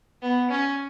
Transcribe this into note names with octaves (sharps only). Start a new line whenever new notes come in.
B3
C#4